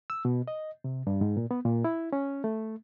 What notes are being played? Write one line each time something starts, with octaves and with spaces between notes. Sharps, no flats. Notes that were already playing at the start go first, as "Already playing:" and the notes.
E6
B2
D#5
C3
G2
G#2
A#2
B3
A#2
E4
C#4
A3